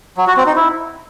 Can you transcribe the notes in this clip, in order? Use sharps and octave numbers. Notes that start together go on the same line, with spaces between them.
F#3
F#4
C4
D#4
E4